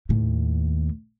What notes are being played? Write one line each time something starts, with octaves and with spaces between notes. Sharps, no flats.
D#2 A2